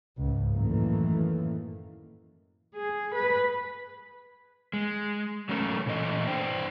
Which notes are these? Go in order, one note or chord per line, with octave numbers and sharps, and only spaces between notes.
C#2 G#2
F#2 A2 D#3 E3 A3 A#3
G#4
B4
G#3
F#3 A3 C#4 A#4
A#2 E3 A3 D#5
D4 C5 D5 G5